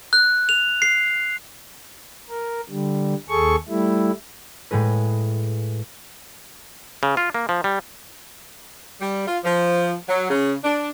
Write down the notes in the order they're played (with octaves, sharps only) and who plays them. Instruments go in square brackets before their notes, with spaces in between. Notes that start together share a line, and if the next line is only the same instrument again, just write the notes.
[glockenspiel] F#6
F7
C7
[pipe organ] A#4
D3 G3
D#2 G#4 A4 C#6
G3 A3 E4
[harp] A2 G#3 G#4 B4
[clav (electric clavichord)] C#3
F4
A#3
F3
G3
[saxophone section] G3
F4
F3
F#3
C#3
D4